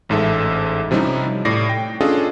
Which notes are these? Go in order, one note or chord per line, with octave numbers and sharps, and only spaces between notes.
A1 G#2 A4 E5
C3 F3 G3 C#4 D#4 E4
A2 D5 A#6 C7
G5
C#4 D4 F4 G#4 A4 D#5